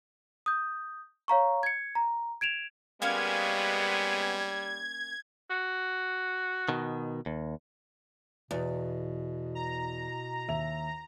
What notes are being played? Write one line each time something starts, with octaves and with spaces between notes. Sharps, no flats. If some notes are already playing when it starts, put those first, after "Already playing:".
D#6 G6
C#5 F5 A#5 C#6
G#6 C#7
A#5
G#6 D7 E7 F7
G3 G#3 A#3 B3 C#4 C#5 G#6
F#4
B2 D#3
D#2
E2 B2
A#5
D#2 E5 F7